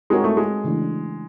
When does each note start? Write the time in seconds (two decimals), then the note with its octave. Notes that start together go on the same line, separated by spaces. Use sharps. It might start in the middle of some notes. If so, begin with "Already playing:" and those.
0.10 G#3 C4 D#4 F#4 A#4 C#5
0.24 A3
0.37 G#3
0.64 C#3 E3 A3 D4